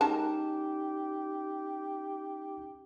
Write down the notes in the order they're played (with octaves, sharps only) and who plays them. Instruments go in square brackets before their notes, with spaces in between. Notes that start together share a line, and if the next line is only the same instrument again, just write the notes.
[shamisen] G#3 A#4 A5 [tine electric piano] C#4 D#4 [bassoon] G4